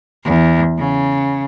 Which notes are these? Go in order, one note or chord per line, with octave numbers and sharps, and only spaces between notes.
E2
C#3